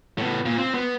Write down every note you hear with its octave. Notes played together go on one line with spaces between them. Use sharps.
A2 B3
A#2
C4
B3